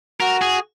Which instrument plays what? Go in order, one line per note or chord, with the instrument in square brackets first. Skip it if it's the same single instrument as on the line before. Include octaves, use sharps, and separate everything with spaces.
[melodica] F#4 [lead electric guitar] A#4
[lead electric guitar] G#4